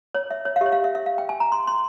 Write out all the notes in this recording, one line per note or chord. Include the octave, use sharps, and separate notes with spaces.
C#5
E5
C#5
F5
G4 C#5 E5
F5
E5
E5
F5
G5
G#5
A#5
C6
C6